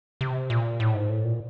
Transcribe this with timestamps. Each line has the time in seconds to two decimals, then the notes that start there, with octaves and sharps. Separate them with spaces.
0.21 C3
0.50 A#2
0.80 A2
0.95 G#2
1.09 A2
1.25 A#2